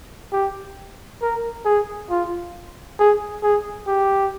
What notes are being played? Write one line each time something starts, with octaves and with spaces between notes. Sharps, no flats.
G4
A#4
G#4
F4
G#4
G#4
G4